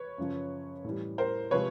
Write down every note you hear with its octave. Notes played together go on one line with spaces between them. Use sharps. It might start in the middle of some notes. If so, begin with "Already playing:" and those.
Already playing: B4 C#5
F#2 C#3 F3
A2 E3 G3
A#4 C5
C3 F3 G#3 B4 C#5